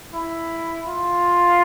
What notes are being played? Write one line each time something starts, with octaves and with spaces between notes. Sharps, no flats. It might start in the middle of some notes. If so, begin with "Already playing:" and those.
E4
F4